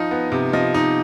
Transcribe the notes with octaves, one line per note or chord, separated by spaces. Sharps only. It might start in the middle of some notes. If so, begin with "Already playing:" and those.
Already playing: F3 D#4 D#5
B3
C3
F3 D#5
D#4